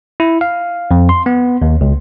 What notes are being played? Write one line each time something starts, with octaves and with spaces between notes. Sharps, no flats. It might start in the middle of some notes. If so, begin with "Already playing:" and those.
E4
F5
F2
C6
B3
D#2
C#2